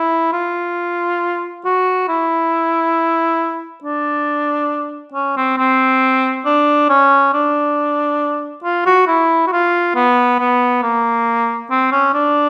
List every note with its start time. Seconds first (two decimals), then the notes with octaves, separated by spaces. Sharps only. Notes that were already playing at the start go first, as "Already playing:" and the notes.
Already playing: E4
0.33 F4
1.65 F#4
2.08 E4
3.84 D4
5.14 C#4
5.37 C4
5.58 C4
6.45 D4
6.89 C#4
7.34 D4
8.64 F4
8.86 F#4
9.07 E4
9.47 F#4
9.52 F4
9.95 B3
10.39 B3
10.83 A#3
11.70 C4
11.92 C#4
12.14 D4